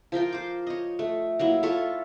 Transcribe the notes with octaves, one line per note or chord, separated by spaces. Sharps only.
F3 F4 A#4 G5
C5 D6
C#5 D#5
A3
F#3 A#3 E4
F4 A4 C#5 E5